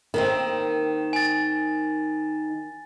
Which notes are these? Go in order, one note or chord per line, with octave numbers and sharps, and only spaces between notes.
D#3 A#3 C4
G#5 A6